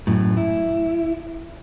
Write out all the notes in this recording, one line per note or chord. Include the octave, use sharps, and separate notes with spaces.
F#2 A2
E4